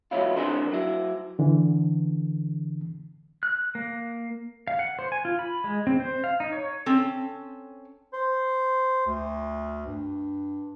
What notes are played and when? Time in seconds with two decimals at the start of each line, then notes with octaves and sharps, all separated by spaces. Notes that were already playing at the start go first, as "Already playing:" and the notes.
0.11 E3 F#3 C#4 E4 F4
0.36 E3 C4 D4 G#4 A#4 C5
0.72 F#3 E4
1.39 D3 E3
3.43 F#6
3.75 A#3
4.67 F5
4.79 F#5
4.99 C5
5.12 G#5
5.25 F4
5.39 B5
5.64 G#3
5.87 C4
6.00 C5
6.24 F5
6.40 D#4
6.52 C#5
6.86 C4 C#4 A4
8.13 C5
9.06 D2
9.87 G2